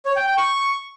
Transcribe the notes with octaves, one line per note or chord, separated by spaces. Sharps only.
C#5
G5
G5
C#6